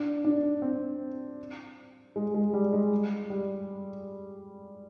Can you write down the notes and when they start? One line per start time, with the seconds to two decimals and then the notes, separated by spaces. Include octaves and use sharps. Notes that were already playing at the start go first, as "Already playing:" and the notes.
Already playing: D4
0.25 D4
0.62 C4
2.16 G#3
2.34 G#3
2.53 G3
2.73 G#3
3.30 G3